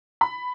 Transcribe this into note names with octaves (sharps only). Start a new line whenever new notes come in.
B5